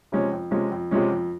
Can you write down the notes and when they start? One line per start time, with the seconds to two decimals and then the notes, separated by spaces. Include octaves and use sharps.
0.12 C3 F3 G#3 C#4
0.32 F2
0.51 C3 F3 G#3 C#4
0.71 F2
0.91 C3 F3 G#3 C#4
1.12 F2